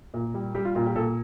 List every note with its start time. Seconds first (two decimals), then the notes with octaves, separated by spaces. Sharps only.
0.14 A#2
0.34 G3
0.55 G3 G4
0.65 F4
0.75 A#2 F4
0.86 G4
0.96 A#2 A4